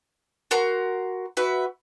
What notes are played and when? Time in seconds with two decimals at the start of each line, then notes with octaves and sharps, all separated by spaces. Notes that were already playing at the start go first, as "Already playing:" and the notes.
0.51 F#4 A#4 A#5 C6
1.37 F#4 B4 E5